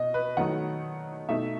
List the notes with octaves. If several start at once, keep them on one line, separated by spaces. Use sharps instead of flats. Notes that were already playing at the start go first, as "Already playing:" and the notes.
Already playing: B2 D#5
B4
D#3 F#3 A3 D#4 F#5
B2 A3 D#4 E5